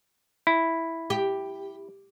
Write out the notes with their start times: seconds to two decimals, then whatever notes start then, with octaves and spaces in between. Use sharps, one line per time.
0.47 E4
1.10 G4